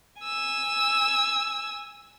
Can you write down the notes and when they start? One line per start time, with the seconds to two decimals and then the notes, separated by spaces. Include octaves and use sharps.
0.22 G#5 E6